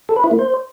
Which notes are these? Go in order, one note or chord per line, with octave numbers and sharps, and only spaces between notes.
A4
B4
E4
A#3
C5